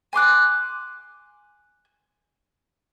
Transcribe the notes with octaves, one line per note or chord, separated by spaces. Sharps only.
G#5 C6 D6 F#6